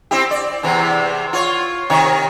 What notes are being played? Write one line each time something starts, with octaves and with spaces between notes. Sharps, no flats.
C4 E4 G4
D5
E2 C3 E3
F4 C#5
C3 D#3 C#5